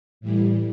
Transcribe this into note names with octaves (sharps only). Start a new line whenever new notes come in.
A2 E3 G3